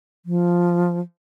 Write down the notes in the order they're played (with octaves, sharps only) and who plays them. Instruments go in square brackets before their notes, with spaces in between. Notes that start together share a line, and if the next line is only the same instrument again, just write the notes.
[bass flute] F3